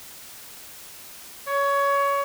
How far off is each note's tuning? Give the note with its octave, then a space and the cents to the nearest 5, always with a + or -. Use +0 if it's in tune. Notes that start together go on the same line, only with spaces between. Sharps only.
C#5 +20